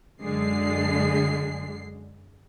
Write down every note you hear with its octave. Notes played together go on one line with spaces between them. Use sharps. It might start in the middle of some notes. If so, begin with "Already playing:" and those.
F#2 D3 G#3 C7